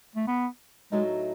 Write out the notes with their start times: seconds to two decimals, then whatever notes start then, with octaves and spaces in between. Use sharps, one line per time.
0.16 A3
0.27 B3
0.92 A2 F#3 G#3 A3 D#4